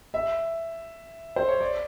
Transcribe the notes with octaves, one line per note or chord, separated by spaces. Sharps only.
E5
C5
C#5
D5